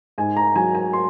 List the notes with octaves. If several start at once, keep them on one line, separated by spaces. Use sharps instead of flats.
G#2 G#5
A#5
F#3 G#5
G#5
C6